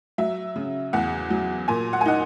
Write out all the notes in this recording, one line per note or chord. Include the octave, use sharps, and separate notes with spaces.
F#3 E5
C#3
E2 F#5
F#3
A#2 G#5
F#5
G#5
D#4 F#5